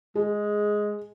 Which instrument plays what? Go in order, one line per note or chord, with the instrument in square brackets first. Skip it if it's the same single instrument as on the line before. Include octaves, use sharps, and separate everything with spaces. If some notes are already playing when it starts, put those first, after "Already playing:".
[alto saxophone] G#3 [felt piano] G#4